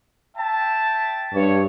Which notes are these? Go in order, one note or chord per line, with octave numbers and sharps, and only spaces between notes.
E5 G5 A5
G2 C#5